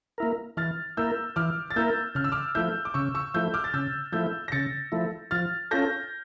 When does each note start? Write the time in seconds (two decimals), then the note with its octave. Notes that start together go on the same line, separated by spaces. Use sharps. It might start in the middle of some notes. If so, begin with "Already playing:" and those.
0.18 A#3 E4 A#4
0.57 E3 F6 A6
0.97 A#3 E4 A#4 E6 G6
1.36 E3 D6 F6
1.70 A6
1.76 A#3 E4 A#4 E6 G6
2.15 C#3 F6
2.24 E6
2.32 D6 F6
2.55 F3 A3 E4 E6 G6
2.85 D6
2.94 C#3 C#6 E6
3.15 C#6 E6
3.34 F3 A3 E4 E6 G6
3.54 D6 F6
3.64 A6
3.74 C#3 E6 G6
4.12 F3 A3 E4 E6 G6
4.48 A#6
4.52 C#3 A6 C#7
4.92 F3 A3 E4
5.31 F3 F6 A6
5.71 C#4 F4 A4 G6 A#6